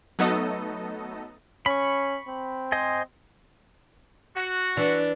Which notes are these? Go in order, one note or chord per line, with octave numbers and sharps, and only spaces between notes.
F#3 A3 B3 D#4 A4 D#5
C#4 B5 C#6
C4
C5 D#5 G#5
F#4
E3 D4